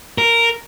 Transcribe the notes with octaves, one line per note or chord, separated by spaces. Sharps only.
A#4